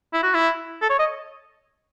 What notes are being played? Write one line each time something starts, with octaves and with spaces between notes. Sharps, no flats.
E4
F#4
E4
A4
C#5
D#5